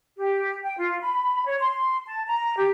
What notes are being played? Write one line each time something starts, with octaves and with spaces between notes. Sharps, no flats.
G4
G5
F4
B5
C#5
C6
A5
A#5
G4